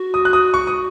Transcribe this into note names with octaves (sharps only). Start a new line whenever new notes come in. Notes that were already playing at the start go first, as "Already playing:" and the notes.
Already playing: F#4
D#6
F#6
D#6
C#6
D#6